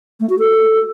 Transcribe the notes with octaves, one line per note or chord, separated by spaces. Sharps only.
A3
F#4
A4